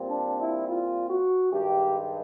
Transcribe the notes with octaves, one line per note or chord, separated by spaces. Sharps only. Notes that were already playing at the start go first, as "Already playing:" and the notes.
Already playing: A#2 G3 C4
D4
E4
F4
F#4
G2 D#3 G#3 G4